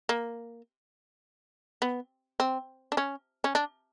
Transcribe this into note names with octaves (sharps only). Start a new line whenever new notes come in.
A#3
B3
C4
D4
C#4
C#4
D4